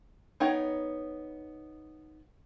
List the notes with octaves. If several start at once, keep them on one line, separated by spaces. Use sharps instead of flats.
B3 D#4 C#5 G5